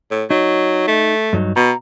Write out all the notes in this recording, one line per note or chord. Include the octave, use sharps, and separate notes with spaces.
A2
F#3 D#4
A3
G2 F#3 D#4
B2 A#5